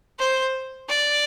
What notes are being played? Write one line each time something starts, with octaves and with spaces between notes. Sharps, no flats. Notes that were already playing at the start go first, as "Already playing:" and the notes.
C5
D5